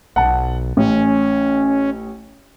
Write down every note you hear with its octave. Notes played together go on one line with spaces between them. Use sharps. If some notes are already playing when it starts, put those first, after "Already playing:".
B1 F#5 A5
A1 C#4